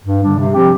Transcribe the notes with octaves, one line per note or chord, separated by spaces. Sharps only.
G2
D3 G3 D4
C3
F3 C4 G4